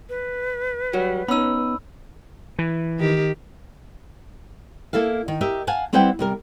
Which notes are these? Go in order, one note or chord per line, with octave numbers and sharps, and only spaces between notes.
B4
F#3 G3 F#4
B3 C#4 D#4 B5 E6
E3
D#3 G4
A#3 E4 A4 E5 F5
D#3
G4 A#4 D#5 E5
F5 F#5 G#5 A5
G3 C4 E4 B4 F#5 G5
C3 G3 A#4